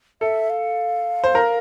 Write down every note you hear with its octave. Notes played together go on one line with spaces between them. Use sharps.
A4 E5
F5
C5
A#4